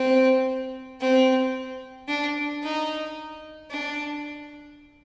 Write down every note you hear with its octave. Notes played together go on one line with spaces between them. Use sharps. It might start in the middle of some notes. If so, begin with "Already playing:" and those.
Already playing: C4
C4
D4
D#4
D4